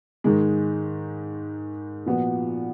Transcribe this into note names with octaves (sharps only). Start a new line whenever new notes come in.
G#2 D#3 G#3
A#2 F3 B3 F#4